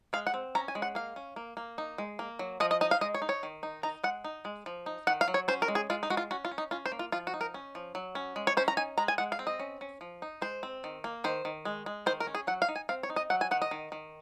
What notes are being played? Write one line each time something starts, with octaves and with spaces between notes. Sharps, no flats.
G#3 F5
F#5
C4
C#4 A#5
G#5
G#3
F#5
A#3 F5
C#4
A#3
A#3
D#4
G#3
A#3
F#3
F3 D#5
D#5
D#4 D#5
F5
G#3 D#5
C#5
D#4
C#5
D#3
D#4
D#4 A#5
G#3 F#5
D#4
G#3
F3
D#4
D#3 F#5
F5
F#3
C#5
C#4 C5
A#4
G#3
G#4
G#3 F4
D#4
G#3 F#4
F4
C#4 F#4
F4
C#4
D#4
C#4 F4
C5
A#3
F4
F3 F4
F#4
D#4
A#4
C#4
F3
F#3
C#4
G#3
C#5
C#4 C5
A#5
D#4 G#5
G#3 A#5
G#5
G#3 F#5
F5
C4
D#5
C#4
C#4
F3
D#4
G#3 C5
C4
D#3
A#3
D#3 C5
D#3
G#3
G#3
D#3 C5
A#4
C#4
G#4
F#3 F#5
F5
D#4
G#5
C4 F5
C#5
D#4
D#5
F#3 F#5
G#5
D#3 F#5
D#5
D#3
D#3